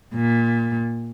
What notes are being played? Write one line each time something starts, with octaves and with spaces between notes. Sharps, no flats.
A#2